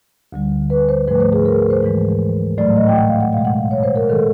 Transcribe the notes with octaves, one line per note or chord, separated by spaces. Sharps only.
D2 D3 G3
B4
C5
G#2 F3 A3 B4
C5
G#4
A#4
C5
G#2 E3 G#3
A2 F#3 A3 D5
D#5
G5
F#5
F5
F#5
B2 G#3 F5
F#5
C#5
C5
A#4
D#3 G#3 A4